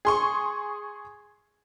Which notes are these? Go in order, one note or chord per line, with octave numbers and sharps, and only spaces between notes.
G#4 C6 C#6